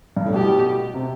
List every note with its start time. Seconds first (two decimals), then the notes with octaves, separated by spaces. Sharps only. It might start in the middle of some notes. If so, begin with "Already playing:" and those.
0.17 G2
0.25 A2
0.34 B2 G4
0.94 C3